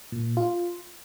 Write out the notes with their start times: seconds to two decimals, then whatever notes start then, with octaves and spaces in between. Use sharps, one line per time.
0.12 A#2
0.37 F4